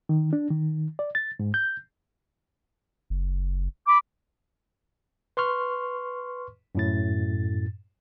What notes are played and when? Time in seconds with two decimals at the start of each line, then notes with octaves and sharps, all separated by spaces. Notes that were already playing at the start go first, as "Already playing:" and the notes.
0.09 D#3
0.33 D4
0.51 D#3
0.99 D5
1.15 A6
1.40 G#2
1.54 G6
3.10 F#1
3.86 B5 D6
5.37 B4 C6 C#6 F6
6.75 F#2 A2 A6